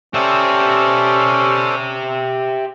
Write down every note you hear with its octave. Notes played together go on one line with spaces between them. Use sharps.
C#4 G4 A4 C5 D5 E5